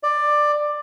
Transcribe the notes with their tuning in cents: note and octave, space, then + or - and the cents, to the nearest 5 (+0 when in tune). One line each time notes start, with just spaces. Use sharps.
D5 +15